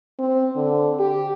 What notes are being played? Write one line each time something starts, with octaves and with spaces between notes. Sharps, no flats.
C4
D3
G4